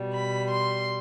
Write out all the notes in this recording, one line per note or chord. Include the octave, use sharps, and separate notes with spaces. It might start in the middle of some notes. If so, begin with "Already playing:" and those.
Already playing: B2 G3
B5
C6